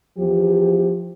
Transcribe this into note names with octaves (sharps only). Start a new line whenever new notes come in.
E2 F3 G4